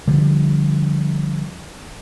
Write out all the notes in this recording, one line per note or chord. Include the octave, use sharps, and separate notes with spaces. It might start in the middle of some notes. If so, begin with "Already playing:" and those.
D3 F3 G3